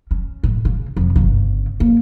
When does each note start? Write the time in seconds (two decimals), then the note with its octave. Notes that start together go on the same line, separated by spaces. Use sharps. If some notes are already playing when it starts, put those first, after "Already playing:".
0.11 C#4
0.43 A2
0.65 C#3
0.97 F2 C3
1.16 G1 C#3
1.80 A#3